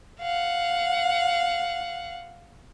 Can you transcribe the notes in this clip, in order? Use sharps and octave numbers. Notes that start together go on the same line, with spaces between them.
F5 F#5